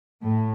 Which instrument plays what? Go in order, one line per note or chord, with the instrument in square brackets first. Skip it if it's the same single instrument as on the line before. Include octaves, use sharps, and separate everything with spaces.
[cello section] A2